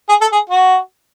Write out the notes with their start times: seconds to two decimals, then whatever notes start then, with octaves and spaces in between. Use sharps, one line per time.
0.09 G#4
0.21 A4
0.32 G#4
0.50 F#4